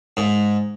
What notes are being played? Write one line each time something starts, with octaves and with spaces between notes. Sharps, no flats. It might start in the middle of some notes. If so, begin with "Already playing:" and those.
G#2